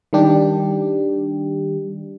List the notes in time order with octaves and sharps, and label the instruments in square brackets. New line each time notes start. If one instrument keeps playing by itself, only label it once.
[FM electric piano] D#3 G3 D4 G4